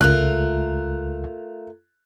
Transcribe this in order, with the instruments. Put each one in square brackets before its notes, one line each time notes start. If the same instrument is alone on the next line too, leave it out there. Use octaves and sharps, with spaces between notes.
[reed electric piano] C#2 [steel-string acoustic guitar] A3 F4 A#4 [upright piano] F#6